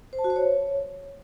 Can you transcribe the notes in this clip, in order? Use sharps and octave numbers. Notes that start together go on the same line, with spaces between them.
C5
A5
F#4
C5
C#5